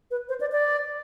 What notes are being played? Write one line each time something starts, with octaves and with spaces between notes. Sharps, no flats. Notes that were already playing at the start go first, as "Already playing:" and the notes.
B4
C5
D5
D5